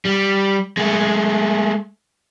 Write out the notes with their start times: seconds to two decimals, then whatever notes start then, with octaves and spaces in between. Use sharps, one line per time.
0.05 G3
0.77 G#3 A3